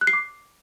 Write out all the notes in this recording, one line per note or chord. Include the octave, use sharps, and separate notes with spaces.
F#6
C7
D6